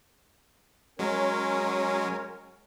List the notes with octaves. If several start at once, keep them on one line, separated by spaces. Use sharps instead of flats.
F#3 G#3 C#4 A#4 C#5